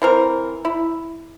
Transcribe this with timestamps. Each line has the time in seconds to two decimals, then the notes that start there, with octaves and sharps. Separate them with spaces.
0.02 E3 C4 A#4
0.65 E4